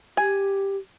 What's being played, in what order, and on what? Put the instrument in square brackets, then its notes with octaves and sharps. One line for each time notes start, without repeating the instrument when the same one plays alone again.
[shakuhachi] G4 [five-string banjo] G#5